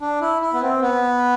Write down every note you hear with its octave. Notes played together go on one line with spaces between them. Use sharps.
D4
E4
E4
B3
C4
B3